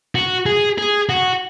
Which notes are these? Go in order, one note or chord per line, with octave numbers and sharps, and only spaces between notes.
F#4
G#4
G#4
F#4